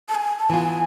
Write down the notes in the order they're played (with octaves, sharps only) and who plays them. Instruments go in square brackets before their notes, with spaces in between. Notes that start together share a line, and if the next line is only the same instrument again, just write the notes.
[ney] A5
G#5
A5
[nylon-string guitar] E3 B3 F4 [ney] G#5